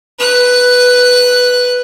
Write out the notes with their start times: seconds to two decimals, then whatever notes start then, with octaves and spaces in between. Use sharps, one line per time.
0.19 B4 F#6